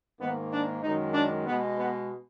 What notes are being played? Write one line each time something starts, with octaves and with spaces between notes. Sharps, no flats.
G#2 D#3 A#3 B3
D4
F#2 D#3 G#3 D#4
D4
B2 G#3 B3
B3